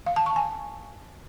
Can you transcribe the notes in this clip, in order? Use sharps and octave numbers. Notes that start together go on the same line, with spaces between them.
F5
A5
C#6
G#5